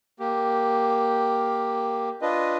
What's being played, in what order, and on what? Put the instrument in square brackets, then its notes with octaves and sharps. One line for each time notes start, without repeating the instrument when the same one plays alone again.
[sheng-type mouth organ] A#3 G4
D4 F4 B4 D#5